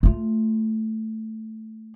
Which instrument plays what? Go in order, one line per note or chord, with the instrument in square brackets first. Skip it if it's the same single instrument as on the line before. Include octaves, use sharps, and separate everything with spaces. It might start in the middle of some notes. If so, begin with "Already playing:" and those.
[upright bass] A3 F4